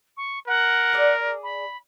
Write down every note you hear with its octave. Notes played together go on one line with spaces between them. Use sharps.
C#6
A#4 F#5
G#4 D5
B5